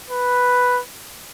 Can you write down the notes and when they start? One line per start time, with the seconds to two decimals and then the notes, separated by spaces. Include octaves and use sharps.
0.10 B4